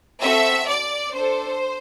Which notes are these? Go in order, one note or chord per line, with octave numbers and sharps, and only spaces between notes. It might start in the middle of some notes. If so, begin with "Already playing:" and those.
C4 F#4 A4 E5
D5
D4 A4 C5